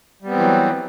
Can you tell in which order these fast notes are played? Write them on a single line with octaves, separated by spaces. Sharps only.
G3 B3 C4 E3 F#3